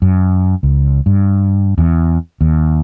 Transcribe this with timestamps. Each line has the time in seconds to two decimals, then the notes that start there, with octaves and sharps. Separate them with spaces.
0.02 F#2
0.63 C#2
1.06 G2
1.78 E2
2.41 D#2